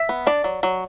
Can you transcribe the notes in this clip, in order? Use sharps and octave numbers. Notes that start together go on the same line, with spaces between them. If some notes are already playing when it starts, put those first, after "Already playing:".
Already playing: E5
B3
D4 D5
F#3
F#3